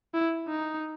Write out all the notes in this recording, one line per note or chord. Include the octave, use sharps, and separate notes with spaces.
E4
D#4